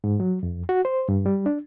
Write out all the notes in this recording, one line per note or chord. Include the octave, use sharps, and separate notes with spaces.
G#2
F#3
F2
F#4
C5
G2
G3
D4